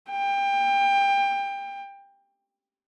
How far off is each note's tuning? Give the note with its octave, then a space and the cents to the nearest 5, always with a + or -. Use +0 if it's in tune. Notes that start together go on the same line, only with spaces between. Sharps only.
G5 +25